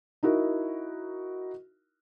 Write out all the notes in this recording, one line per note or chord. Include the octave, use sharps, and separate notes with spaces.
D#4 E4 F#4 A#4